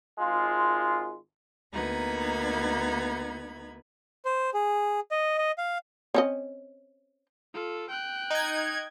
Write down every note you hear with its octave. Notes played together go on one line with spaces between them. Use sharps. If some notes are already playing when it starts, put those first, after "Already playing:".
G#1 G#3 F4
D2 A#3 B3 D#4 B5 G#6
C5
G#4
D#5
D#5
F5
C4 C#4 D#5
F4 A4
G5 F#6
D#4 G#6